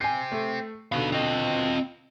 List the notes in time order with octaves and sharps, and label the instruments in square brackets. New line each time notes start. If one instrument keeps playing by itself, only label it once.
[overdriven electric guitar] C4 G4 [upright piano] G#5 C7
[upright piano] A3
[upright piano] B2 D3 [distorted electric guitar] D#4 F5 [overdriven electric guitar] B5
[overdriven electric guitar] C4 [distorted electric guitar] F4 D#5